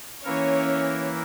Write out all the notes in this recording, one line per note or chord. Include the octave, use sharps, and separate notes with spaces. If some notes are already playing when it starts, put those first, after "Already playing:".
E3 A#3 C#4 E4 A#4 C#5